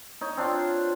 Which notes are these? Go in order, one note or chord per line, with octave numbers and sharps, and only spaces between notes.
D#4 C#5
C4 D4 F4 C#5